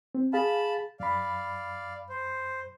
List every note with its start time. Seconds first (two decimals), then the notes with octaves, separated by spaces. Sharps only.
0.15 C4
0.33 G#4 F5 A5 B5
1.00 F#2 D5 F5 B5
2.09 C5